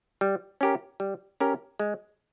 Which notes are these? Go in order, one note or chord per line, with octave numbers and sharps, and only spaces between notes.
G3
C#4 G4 A#4
G3
C#4 G4 A#4
G#3